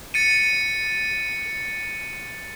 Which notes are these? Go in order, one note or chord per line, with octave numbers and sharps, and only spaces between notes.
A6 C#7 D#7